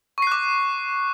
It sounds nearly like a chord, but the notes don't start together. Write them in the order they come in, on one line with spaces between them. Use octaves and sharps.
C#6 C7 F#6 D6